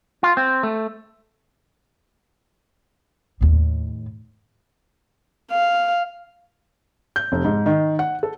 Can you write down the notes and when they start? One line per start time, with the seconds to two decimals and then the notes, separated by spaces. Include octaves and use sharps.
0.23 F4
0.37 C4
0.63 A3
3.41 D#2 A2
5.52 F5
7.16 G6
7.32 F1
7.45 G#2
7.66 D#3
7.99 F#5
8.23 A4